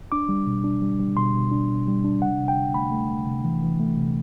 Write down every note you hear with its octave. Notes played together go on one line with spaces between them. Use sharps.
D4 D6
G3
B2
D4
G3
G3
B2 C6
B2
D4
B2
G3
D4
C3 F#5
C3
G5
D2
A3 B5
A3
A3
C3
E3
E3
A3
C3